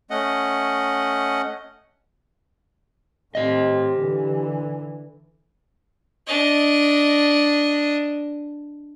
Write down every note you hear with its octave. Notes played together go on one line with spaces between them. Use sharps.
A3 C#4 D#5 F#5
A2 C4 G4 D#5
D3 E3
D4 D#5